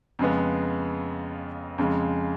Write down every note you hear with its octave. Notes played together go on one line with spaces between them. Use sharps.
F2 C#3 G#3 B3
F2 C#3 G#3